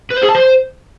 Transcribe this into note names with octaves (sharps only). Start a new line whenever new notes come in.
B4
C5
G#4
A5
C5